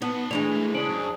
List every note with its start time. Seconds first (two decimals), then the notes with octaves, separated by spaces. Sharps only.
0.02 B3 D#4 A5
0.31 D3 E3 G#3 A3 D4 E4 F7
0.51 A3 A#3
0.74 C#3 C#4 D4 G#4 C5 D7 F#7
0.89 F#2